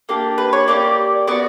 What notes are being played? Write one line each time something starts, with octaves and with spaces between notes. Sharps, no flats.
A#3 D4 G4
B4
C#5
A#3 D4 G4 D5
B3 F#4 D5